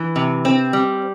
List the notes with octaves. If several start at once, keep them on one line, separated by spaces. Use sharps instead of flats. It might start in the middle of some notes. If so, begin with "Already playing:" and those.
Already playing: E3
C3
C4
G3